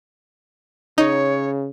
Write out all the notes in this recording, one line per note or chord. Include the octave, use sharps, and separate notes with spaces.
C#3 D#4 C#5